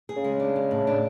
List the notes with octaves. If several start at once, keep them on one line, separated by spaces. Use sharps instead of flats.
G#4
C#3
G#3
D4
G#3
A2
D4